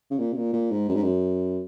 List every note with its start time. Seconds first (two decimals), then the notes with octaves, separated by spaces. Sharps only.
0.11 C#3
0.19 A#2
0.32 C#3
0.36 A#2
0.53 A#2
0.71 G#2
0.89 F#2
0.95 G#2
1.02 F#2